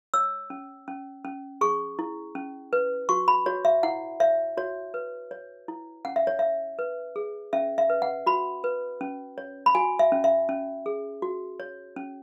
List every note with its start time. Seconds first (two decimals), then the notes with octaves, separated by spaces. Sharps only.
0.14 C#5 E6
0.50 C#4
0.88 C#4
1.25 C#4
1.61 G#4 C#6
1.99 E4
2.35 C#4
2.73 B4
3.09 F#4 C#6
3.28 B5
3.46 F#4 C#5
3.65 E5
3.83 E4 F#5
4.20 C#5 E5
4.57 F#4 C#5
4.94 B4
5.31 C#5
5.68 E4
6.05 C#4 F#5
6.16 E5
6.27 C#5
6.39 C#5 E5
6.79 B4
7.16 G#4
7.53 C#4 E5
7.78 E5
7.90 B4
8.02 F#5
8.26 F#4 B5
8.64 B4
9.01 C#4
9.38 C#5
9.66 B5
9.75 F#4 G#5
9.99 E5
10.12 C#4
10.24 E5
10.49 C#4
10.86 G#4
11.22 F#4
11.60 C#5
11.96 C#4